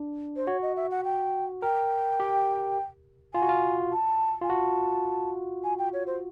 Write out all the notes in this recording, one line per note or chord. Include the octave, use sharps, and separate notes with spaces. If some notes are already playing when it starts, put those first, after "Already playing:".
Already playing: D4
C5
F#4 C#5
D#5
E5
F#5
G5
A#4 G5
G4
F4 G#5
F#4
F4
A5
F4 G#5
F#4 A5
G#5
G5
C#5
C5